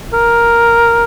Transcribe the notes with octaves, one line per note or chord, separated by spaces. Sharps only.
A#4